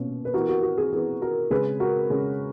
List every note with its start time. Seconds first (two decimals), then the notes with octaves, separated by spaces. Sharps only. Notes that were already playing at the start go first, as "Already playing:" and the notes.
Already playing: B2 A#3 C#4
0.25 B4
0.34 E3 B3 F#4 A#4
0.49 F#4
0.63 F#4
0.78 G#4
0.92 E3 B3 G#4
1.21 F#4 A#4
1.51 C#3 G#3 C#4 G#4 B4
1.80 F#4 A#4
2.10 C#3 G#3 C#4